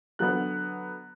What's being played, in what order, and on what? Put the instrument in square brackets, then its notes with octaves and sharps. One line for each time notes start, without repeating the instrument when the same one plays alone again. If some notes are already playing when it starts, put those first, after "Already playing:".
[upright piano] D3 F#3 B3 F#6